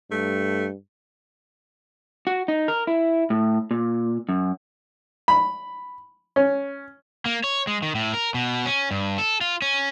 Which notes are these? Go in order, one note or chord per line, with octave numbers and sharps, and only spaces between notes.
G2 A3
F#4
D#4
A#4
E4
A2
A#2
F#2
B5
C#4
A#3
C#5
G#3
D#3
A2
A#4
B2
C#4
G2
A4
F4
C#4